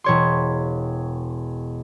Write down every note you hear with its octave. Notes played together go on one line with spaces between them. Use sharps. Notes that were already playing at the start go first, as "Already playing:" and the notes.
E1 C#5 C6